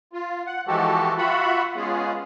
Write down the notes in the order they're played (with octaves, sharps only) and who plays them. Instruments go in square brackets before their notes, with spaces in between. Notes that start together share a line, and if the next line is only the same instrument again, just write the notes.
[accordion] F4
F#5
E3 F3 G#3 F#4 G4 A4
F4 F#4 E5 F#5 B5
G#3 B3 C#4 F4 G#4